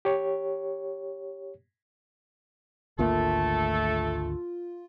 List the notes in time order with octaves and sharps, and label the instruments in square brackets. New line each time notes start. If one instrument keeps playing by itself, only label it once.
[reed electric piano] G4 C#5
[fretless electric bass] G#1 D2 A#3 [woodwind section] A3 A4 [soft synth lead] F4